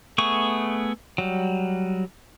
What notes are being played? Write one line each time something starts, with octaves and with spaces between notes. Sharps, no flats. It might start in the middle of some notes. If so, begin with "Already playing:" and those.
A3 B3 G#4 C#6
F#3 G3